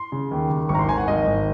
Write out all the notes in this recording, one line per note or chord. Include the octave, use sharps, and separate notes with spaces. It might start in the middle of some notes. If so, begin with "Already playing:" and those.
Already playing: C6
C#3
D#2
D#2
G#1 C#6
A#5
C6
G#1 G#5
F#5
G#1 D#5
G#1